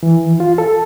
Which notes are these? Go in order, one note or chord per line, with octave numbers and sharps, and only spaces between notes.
E3
F4
A4